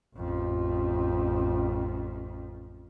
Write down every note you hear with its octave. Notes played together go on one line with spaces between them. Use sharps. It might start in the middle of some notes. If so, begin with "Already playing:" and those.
A1 F2